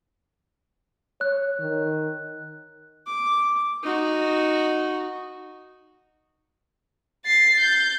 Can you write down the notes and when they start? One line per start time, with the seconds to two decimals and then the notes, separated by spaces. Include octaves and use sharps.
1.21 C#5 F#6
1.59 D#3
3.06 D6
3.83 D#4 F#4
7.26 A6 C7
7.60 G6 A6